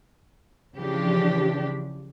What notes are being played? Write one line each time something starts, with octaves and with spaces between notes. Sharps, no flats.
C#3 E3 F3 D4 G4